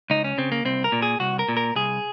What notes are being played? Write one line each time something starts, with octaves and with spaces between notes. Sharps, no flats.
C#2 D#4
C#4
C#3 C4
A#3
C2 C4
A#4
A#2
G#4
C2 F#4
A#4
A#2
A#4
C2 G#4